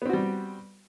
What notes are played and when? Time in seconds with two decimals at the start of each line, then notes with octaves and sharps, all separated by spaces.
0.02 B3
0.06 C4
0.09 F#4
0.13 G3